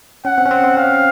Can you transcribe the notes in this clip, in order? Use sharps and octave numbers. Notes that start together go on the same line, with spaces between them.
C#4 F#5
C4
C#4
C4
C4
C#4 F5